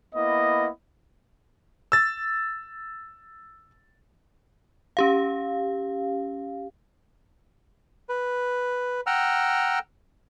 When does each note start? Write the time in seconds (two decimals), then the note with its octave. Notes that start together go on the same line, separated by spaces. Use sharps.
0.15 A#3 B3 E4 D#5
1.92 E6 A6
4.97 C#4 G4 F5
8.09 B4
9.07 F#5 G5 A#5 E6 F6